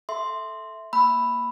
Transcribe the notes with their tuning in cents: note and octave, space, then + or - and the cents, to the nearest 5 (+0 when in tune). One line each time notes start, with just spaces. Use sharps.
A4 +0 E5 -5 C6 +0
A#3 +0 B5 +0 E6 +0